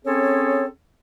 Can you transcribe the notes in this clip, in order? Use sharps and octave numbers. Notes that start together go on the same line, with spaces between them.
C4 C#4 G#4 A4 C#5